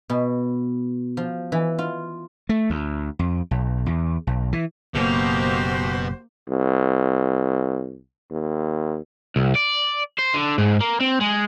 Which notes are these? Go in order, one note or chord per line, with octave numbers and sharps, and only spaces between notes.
B2
F3
E3
F4
A3
D2
F2
B1
E2
B1
E3
F#1 B2 A#3 F#4 G4 C5
C2
D#2
C2
D5
C5
D3
G#2
A#3
C4
G#3